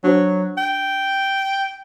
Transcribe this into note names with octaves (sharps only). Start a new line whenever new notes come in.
F#3 D4 F#4 C5
G5